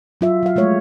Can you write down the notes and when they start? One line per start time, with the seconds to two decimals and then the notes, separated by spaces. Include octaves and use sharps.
0.21 F#3 F4 E5
0.43 F#3 F5
0.56 F3 G#3 A3 C#5